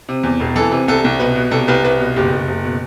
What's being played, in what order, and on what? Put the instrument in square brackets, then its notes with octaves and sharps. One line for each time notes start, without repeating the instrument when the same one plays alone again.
[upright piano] C3
E2
E1
E3 A4
C3
C2 A4
C2
B2 B4
B2
C2 A4
C2 B4
C2 B4
B2
F#1 G4
F#1
F#1
B2